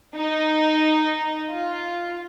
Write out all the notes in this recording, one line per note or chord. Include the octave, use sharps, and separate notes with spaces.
D#4
F4